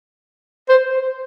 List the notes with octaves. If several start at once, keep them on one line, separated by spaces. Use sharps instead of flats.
C5